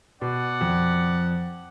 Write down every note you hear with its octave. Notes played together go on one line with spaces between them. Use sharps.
B2 D5 F#5
F2